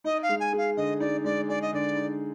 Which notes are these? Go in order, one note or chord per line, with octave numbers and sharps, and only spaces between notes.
D#4 D#5
F5
G#3
G#5
G#4
F5
D3 D#5
D#4 D5
G#3 D5
G#4 D5
D#5
D3 D5
D#4